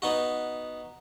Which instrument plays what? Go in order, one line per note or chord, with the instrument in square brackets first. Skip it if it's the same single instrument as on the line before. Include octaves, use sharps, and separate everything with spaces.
[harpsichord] B3 D#4 F#4